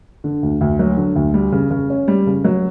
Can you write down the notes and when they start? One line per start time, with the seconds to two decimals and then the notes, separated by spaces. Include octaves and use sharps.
0.24 D3
0.43 D2
0.61 D2
0.79 F#3
0.97 D3
1.16 D2
1.34 G3
1.52 C#3
1.71 C#3
1.90 C#4
2.08 G3
2.27 C#3
2.44 F#3